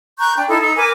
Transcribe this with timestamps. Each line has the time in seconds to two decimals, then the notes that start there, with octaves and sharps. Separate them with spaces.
0.20 A#5 C#6 F#6 G6
0.37 D4 G5
0.48 D#4 E4 A4
0.62 D#4 E6
0.76 A#4 B4 G#5 D6